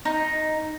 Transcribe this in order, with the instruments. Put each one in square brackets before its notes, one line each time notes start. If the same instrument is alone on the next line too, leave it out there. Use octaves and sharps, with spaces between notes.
[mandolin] D#4